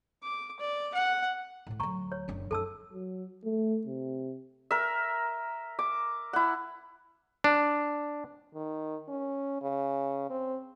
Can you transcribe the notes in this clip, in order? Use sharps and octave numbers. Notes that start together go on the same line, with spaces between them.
D6
D5
F#5
A2 A3
D2 F#3 A#5 C#6
C#5
F#1 D4
F#2 D#4 A4 A5 E6
F#3
A3
C3
A#4 E5
D6
E4 F#5
D4
D#3
C#4
C#3
C4